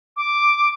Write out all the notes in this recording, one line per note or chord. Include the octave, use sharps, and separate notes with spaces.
D6